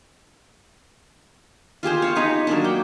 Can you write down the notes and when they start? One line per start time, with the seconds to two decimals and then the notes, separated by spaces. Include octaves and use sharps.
1.83 F4 G4 G#4 C5
2.02 C#5 F5
2.15 D#4 G#4 B4 C#5
2.47 F#3 A#3 D4
2.64 G5